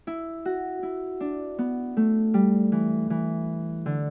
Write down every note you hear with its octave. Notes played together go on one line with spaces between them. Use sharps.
E4
F#4
E4
D4
B3
A3
G3
E3
E3
D3